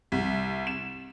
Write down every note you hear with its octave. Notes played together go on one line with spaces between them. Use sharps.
C2
E7